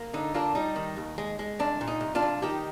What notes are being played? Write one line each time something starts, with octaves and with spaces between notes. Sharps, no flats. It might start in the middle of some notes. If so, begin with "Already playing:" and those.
Already playing: A#3
D3 D#4
A#3 D4 F4
G3 D#4
D#3
D#2
G#3
G#3
C2 D4
A#2
D#4
C2
D4 F4
C2
D#3 D#4 G4